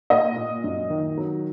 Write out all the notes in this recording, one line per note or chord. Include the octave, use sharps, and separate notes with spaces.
A#2 D#5
A#2
F#2
D#3
F#3